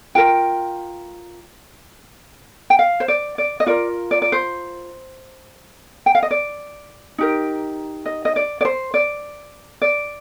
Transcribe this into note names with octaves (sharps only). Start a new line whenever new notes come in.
F4 A#4 G5
G5
F5
C5
D5
D5
D#5
F4 A#4 D5
D5
D5
C5
G5
F5
D#5
D5
D#4 G4 A#4
D#5
D#5
D5
D5
C5
D5
D5